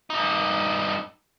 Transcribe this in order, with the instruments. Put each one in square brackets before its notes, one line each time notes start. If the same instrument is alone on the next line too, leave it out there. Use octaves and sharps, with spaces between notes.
[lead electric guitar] G2 D#4